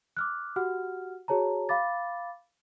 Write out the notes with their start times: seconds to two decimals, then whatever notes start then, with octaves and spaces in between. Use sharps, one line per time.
0.17 D6 F6 F#6
0.56 F#4 G4 F#5 F6
1.28 F#4 G#4 C#5 A5 A#5
1.69 F5 B5 D6 A6